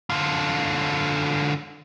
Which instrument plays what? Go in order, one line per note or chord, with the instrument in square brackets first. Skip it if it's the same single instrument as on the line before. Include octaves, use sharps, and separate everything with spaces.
[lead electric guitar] D3 F4